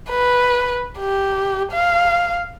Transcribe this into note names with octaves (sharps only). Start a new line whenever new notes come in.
B4
G4
F5